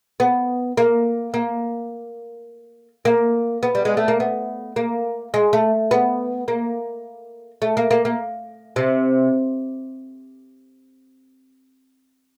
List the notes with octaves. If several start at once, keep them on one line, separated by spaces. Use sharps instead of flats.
B3
A#3
A#3
A#3
B3
G3
G#3
A3
A#3
B3
A#3
G#3
A3
B3
A#3
A3
A#3
A#3
A#3
C3